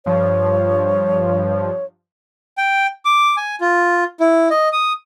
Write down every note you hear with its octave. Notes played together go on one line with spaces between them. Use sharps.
G2 F3 C#5
G5
D6
G#5
F4
E4
D#5
D#6